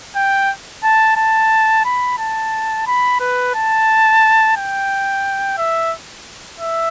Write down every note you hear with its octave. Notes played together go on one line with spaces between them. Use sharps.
G5
A5
A5
B5
A5
B5
B4
A5
G5
E5
E5